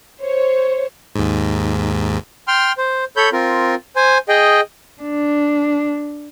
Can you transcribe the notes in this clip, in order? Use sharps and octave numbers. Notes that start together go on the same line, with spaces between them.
C5 C#5
D#2 G#2
G5 C6 F6
C5
A4 C#5 B5 G6
C4 F4 A#4
C5 G#5
G#4 D#5 G5
D4